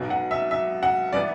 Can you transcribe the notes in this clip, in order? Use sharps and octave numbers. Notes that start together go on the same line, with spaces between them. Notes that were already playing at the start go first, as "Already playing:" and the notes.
Already playing: B1 B2 F#3
F#5
E5
E5
F#5
E3 B3 D5